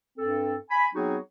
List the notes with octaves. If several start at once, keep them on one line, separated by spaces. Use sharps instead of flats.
G2 C4 A4
G#5 B5
F#3 B3 C4 D#4 F#4 G#4